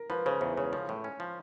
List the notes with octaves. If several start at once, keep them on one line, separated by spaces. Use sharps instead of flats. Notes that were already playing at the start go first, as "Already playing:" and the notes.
Already playing: A#4
F3 B4
C#3 C5
E2 C5
C#3 C#5
F3 C#5
A2
C#4
F3